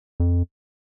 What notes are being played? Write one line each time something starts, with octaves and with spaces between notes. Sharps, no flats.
F2